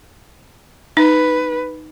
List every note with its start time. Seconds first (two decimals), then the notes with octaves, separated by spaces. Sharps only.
0.97 D#4 B4